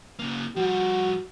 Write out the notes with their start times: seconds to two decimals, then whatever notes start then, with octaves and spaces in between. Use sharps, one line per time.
0.19 C#3 A#3
0.56 F3 G3 F#4